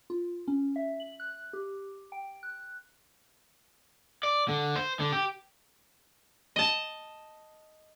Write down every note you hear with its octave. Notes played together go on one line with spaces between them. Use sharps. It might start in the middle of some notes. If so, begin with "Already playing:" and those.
F4
C#4
E5
F#7
F#6
G4
G5
F#6
D5
D3
C5
D3
G4
D#5 A5